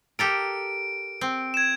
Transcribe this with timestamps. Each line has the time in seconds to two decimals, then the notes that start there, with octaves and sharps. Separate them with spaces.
0.19 G4 A4 A#4 D7
1.21 C4
1.54 G#6 E7